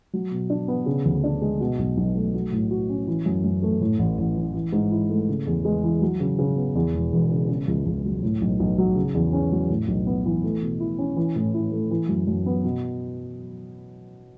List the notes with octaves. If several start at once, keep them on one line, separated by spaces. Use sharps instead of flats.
F#3
B2
D4
B3
C#3
D2
D4
G#3
B2
B1
B1
A3
F#3
A2
F#4
C#4
E3
F#2
F#2
A3
A2
A1
A1
E3
E3
G#2
E4
A3
C#3
E2
G#3
E3
F#3
C#3
C#3
B3
E2
E1
E1
C#3
C#3
C#2
C#2
F#3
A2
B1
B1
F#3
C#3
E2
C#4
F#3
A2
B1
B3
E3
A3
B2
E4
C#4
E3
A2
E4
A3
E3
F#2
F#2
B3
B2